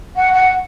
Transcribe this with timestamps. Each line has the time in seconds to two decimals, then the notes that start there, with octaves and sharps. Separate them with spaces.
0.16 F#5
0.33 F#5